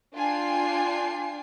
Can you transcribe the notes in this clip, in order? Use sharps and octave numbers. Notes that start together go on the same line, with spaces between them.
D4 F4 G5 G#5 C7